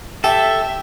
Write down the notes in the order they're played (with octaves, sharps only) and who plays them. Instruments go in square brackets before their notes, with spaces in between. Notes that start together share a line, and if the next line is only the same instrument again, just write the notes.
[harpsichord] G4 [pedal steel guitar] A4 [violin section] E5